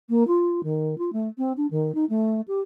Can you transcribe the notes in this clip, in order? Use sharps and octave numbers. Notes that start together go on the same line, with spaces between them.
A#3
F4
D#3
F4
A3
C4
D4
D#3
D#4
A3
G4